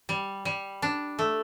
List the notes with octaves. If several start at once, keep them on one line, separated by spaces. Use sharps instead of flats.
G3
G3
D4
A3